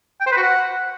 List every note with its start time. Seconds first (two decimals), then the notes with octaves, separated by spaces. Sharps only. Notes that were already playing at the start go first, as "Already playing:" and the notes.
0.21 G5
0.26 C5
0.32 B4
0.37 F#4
0.43 F#5